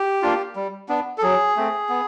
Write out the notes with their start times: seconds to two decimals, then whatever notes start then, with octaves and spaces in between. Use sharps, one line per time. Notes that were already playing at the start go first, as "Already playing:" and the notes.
Already playing: G4
0.22 A#3 D4 F4
0.56 G3
0.89 B3 D4
1.18 A4
1.22 F#3 G#4
1.57 A3 C4
1.89 B3